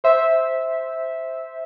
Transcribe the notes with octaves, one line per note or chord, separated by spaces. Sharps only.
C5 E5